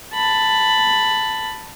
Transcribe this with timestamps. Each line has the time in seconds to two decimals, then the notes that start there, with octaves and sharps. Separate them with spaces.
0.13 A5 B5